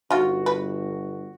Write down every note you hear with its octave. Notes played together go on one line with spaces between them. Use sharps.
G1 D#4 F4 F#4
B4